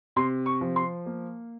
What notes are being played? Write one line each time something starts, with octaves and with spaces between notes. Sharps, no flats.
C3 C6
C#6
F3
C6
A#3